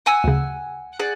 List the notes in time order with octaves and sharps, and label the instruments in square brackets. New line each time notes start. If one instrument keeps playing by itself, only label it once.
[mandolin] F#5 G#5 E6
[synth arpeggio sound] D2 C#3
[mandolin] G#4 D5 F#5